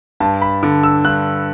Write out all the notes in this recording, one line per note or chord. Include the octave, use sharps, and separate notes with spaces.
G2 A5
B5
D3
E6
G2 F#6